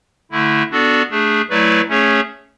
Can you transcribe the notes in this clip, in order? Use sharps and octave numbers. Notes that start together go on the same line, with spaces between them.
D3 A3 E4
B3 D4 F#4 A4 D5
A3 D4 G#4
F#3 A3 E4 B4 D5
A3 C#4 G#4 C#5